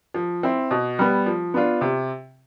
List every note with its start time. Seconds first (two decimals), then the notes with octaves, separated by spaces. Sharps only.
0.14 F3
0.43 C4 E4
0.71 B2
0.99 G3 B3
1.26 F3
1.54 B3 D4 F4
1.81 C3